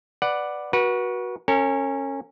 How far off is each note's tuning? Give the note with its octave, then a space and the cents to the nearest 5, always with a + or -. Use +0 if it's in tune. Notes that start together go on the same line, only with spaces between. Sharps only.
B4 +0 D5 +5 F#5 +0
F#4 +0 B4 -35
C#4 -20 A#4 -45